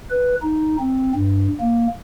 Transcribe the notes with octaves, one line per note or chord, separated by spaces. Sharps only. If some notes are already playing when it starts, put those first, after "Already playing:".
B4
D#4
C4
G2
A#3